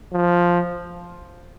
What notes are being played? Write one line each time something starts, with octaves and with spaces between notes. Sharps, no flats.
F3